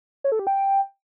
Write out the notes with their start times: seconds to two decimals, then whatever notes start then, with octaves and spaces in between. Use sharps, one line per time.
0.24 C#5
0.32 A4
0.39 G4
0.47 G5